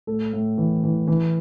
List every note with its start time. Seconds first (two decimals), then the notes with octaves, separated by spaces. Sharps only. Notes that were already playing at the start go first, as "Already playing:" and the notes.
0.07 A2 A4
0.33 A2
0.58 E3
0.83 E3
1.07 E3